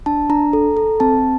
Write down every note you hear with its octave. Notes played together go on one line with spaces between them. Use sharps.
D4 A5
D4 A#5
A4
A4
C4 A5